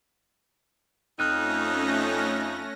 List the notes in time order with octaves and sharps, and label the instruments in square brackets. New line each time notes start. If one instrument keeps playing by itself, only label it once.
[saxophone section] F2 D#4 [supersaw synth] A3 C#4 A#6 [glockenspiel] F6 F#6 D#7